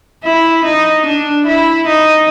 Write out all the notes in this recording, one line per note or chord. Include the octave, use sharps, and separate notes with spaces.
E4
D#4
D4
E4
D#4